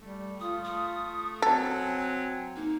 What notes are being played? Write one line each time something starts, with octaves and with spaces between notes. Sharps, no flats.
G3 A3
F4 D#6
A3 D#6
F#3 C4 A4 G#5
A#3 D#4